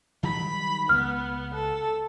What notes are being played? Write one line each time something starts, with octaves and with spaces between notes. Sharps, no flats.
D#3 F#3 G3 B5
C#2 B3 F6
A4